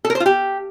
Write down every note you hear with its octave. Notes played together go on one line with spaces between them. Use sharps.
A4
A#4
C5
F4
G4